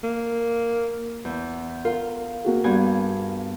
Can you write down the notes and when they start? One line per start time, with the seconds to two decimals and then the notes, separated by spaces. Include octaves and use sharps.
0.04 A#3
1.25 E2
1.85 F4 A#4
2.44 A#3 F#4 G#4
2.64 G2 B3 G#5